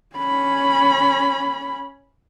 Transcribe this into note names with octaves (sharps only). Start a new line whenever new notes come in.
C#4 B5